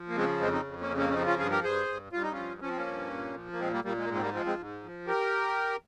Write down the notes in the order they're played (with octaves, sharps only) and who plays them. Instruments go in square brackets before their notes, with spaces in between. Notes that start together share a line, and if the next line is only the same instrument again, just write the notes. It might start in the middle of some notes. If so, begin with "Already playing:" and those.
Already playing: [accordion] F3
A#3
C#3 G#3 C4
F2 G#3 C4
C4 D#4
F2
A#3 C#4
C#3
A#3 C#4
C#4
F3 C4 D#4
C#4 F4
G2 F4 G#4
G4 A#4
G2 G#4 C5
G2
G2 F4
D#4
F3 C#4 F4
F3 C#4
C4
A#3 C#4
G2
A#2
F3
A#3
A#2 G#3 C4
G3 A#3
A#2 G3 A#3
G#3
A#3
G#2 G#3
C4
G3 A#3
F3 G#3 C4
G#3 C4
G#2
F3
G4 A#4